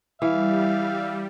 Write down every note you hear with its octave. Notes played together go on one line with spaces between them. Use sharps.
E3 G3 E5 F5